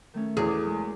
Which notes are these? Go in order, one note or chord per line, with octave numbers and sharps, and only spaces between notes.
D#3 A3 C#4
E2 F#4 G#4 A#4 C#5
D6
G#3